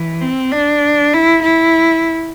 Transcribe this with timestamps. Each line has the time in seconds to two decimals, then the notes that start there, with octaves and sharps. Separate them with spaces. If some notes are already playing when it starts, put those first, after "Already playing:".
Already playing: E3
0.22 C4
0.52 D4
1.14 E4
1.43 E4